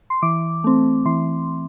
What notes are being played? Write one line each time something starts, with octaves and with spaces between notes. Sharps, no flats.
C6
E3 D6
A3 C4
E3 C6